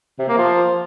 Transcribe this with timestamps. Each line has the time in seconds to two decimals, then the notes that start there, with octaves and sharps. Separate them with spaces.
0.19 C3
0.28 A#3
0.37 F3